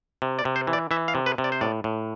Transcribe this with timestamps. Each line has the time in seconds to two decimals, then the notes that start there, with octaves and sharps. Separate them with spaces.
0.22 C3
0.39 D5
0.45 C3
0.56 C5
0.67 E3
0.73 D5
0.91 E3 E5
1.08 F5
1.15 C3
1.26 B4
1.38 C3
1.44 D5
1.52 C5
1.61 A2 D5
1.84 A2